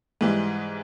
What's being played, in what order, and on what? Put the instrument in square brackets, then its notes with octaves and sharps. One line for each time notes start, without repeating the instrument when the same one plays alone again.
[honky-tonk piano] G#2 E3 G3 G#3